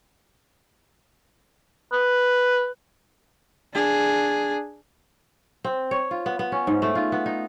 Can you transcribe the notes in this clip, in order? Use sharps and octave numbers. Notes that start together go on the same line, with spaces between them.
B4
D4 G#4
C4
C#5
F4
B3
B3
C#4
G#2
A3
F4
B3
D#4